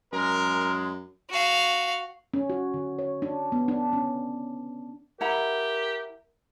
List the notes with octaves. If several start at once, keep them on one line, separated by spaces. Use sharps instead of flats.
F#2 G#3 A#4
F#4 F5
C#4
F#4
D3
C#5
D4
B3
D4
C#4
E4 G4 A#4 F#5 A#5